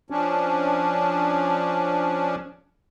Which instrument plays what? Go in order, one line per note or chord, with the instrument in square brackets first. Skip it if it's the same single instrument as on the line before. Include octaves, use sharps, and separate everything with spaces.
[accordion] F3 C#4 D4